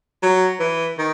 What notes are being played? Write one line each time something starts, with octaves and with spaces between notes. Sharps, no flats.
F#3
E3
D#3